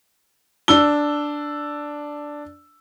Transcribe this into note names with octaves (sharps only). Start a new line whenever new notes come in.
D4 E6 G7